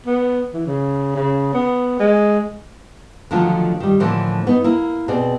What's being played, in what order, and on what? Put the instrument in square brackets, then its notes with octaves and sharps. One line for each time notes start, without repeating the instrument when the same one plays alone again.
[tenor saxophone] B3
E3
C#3
C#3
B3
G#3
[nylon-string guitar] D3 D#3 F3 F#3 A3 F4
D#3 G3
A2 D3 E3 F3 A3 A#3
B3 D#4
A#3 E4
B2 C4 G#4 D5